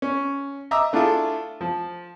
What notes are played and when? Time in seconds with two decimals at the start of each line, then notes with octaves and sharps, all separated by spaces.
0.02 C#4
0.71 D#5 E5 A#5 D6 E6
0.93 A3 D4 E4 F4 G#4 A4
1.61 F3